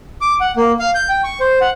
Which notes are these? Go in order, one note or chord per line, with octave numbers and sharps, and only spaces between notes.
D6
F#5
A#3
F5
G6
G5
C#6
C5
F#5